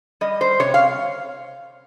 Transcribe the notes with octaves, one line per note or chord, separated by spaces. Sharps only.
G3 D#5
C5
C3 C#5
F5